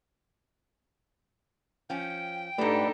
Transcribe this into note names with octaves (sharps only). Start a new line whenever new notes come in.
F3 C#4 G5
G#2 A3 D4 D#4 G4 A4 B4 D5